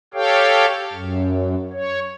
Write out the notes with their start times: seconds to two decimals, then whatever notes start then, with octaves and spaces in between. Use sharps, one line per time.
0.14 G4 A4 C#5 F5 G5
0.93 F#2
1.73 C#5